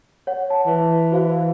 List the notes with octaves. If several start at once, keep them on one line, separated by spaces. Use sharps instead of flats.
C#5 F#5
A5
E3
F#4 C5 F5